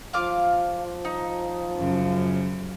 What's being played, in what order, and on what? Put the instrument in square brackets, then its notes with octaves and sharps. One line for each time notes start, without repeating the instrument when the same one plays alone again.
[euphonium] F3 [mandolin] F4 F5 D6
[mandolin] D#4
[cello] F#2 C#3